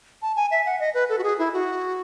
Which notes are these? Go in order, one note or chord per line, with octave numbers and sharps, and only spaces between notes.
A5
G#5
E5
F#5
D#5
B4
A4
F#4
G#4
E4
F#4